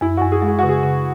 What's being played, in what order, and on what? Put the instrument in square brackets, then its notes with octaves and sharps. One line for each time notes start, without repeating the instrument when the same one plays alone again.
[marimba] F#2 [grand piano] E4
[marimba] F#2 [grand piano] F#4
[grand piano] G#4
[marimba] G#3
[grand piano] G#4
[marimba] C#3 [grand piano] F#4
[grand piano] G#4
[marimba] C#3